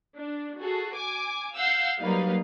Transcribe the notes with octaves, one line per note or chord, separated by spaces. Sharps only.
D4
F#4 G#4 A4
G#5 D6
F5 F#5 E6 G6 C7
F#3 G3 A#3 D#4 B4 F5